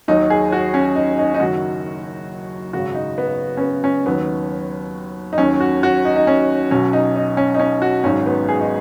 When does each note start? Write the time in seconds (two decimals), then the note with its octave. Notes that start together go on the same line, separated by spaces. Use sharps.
0.08 D#2 D#3 F#3 D#4
0.30 G#4
0.52 F#4
0.74 C#4
0.96 D#4
1.18 D#4
1.34 D#4
1.40 F#1 F#2 D#3 F#3 F#4
2.73 G#1 F#2 C#3 F#4
2.95 D#4
3.18 B3
3.57 C#4
3.61 B3
3.84 C#4
4.06 D#2 D#3 F#3 B3
5.33 D#4
5.38 D#2 D#3 F#3 C#4
5.60 F#4
5.83 F#4
6.05 D#4
6.16 D#4
6.27 C#4
6.71 B1 B2 F#3 C#4
6.93 D#4
7.16 D#4
7.37 C#4
7.54 D#4
7.59 C#4
7.82 F#4
8.04 G#1 G#2 D#3 F#3 C#4
8.26 B3
8.49 G#4
8.60 D#4